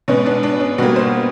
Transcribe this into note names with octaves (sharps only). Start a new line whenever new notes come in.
B2 G#3 B3 C#4
D4
D4
C#4
B2 G3 A#3 F#4
C5